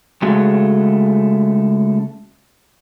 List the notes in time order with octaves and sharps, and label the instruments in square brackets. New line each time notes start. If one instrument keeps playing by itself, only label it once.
[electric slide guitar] C#3 G#3 A3 F#4